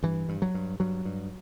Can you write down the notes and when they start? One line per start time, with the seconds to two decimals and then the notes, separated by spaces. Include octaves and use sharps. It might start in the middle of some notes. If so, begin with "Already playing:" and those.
0.03 G2 E3
0.29 G2
0.42 F#3
0.54 G2
0.80 G2 F#3
1.05 G2